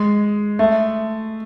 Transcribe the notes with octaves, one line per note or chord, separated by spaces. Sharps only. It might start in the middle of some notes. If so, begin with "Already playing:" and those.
Already playing: G#3
A3